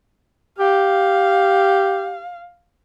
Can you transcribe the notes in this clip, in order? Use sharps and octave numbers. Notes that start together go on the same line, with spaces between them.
G4 F5